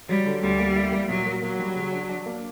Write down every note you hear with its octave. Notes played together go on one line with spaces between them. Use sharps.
F#3 G3
D3
D2 G3
A#3
E4
A#3
A#2 F#3
A#4
F#3 A#3
G3
C#3
D4
D4
A#3